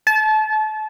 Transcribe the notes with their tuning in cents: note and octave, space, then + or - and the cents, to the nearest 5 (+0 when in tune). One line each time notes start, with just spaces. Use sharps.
A5 -30